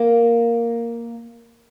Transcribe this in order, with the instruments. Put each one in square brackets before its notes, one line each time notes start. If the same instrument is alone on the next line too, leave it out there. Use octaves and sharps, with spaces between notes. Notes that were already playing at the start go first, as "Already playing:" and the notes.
Already playing: [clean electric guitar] A#3